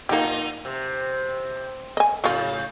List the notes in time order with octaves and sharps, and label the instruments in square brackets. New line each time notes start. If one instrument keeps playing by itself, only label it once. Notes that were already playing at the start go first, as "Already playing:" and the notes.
[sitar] A#2 D#4 [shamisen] A#3 G4
[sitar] C3
[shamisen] D#5 G#5
[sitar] A2 C#3 [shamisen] F#3 F4